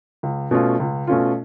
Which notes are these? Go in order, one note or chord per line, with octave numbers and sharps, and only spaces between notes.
C#2
B2 A3 C#4 F4
C#2
B2 A3 C#4 F4